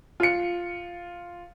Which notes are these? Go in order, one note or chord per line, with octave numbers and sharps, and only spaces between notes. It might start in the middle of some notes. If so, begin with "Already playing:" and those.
F4 C#7